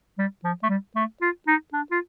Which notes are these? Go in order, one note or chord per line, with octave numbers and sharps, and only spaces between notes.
G3
F3
A3
G3
A3
F4
D#4
D4
F4